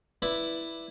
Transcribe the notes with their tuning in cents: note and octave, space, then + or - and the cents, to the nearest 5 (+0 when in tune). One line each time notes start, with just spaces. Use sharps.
E4 +0 B4 +0 D5 +0